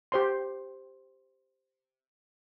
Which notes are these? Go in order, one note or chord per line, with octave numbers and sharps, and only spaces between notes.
G4 C5 C6